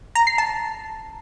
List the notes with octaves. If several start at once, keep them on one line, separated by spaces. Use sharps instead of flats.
A#5
C7
A5